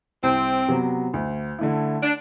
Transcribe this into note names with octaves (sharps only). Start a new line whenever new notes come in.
C2 C4
C3 F#3 B3
D2
D3 A3 E4
D4